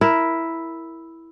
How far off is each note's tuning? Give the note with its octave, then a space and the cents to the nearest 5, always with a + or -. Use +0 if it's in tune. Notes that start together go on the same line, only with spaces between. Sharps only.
E4 +0 A#4 +0